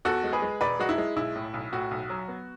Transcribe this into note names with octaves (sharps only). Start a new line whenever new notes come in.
E2 F#4 A4
G#3
G#4 B4
G#3
E1 B4 D5
G#3 F#4
E4
G#3
B1 E4
A2
B1
A2 F#4
B1
F#3
B3